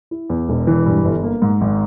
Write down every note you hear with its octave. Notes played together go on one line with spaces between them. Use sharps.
E4
E2
E1
E3
G2
G1
A#3
G#2
G#1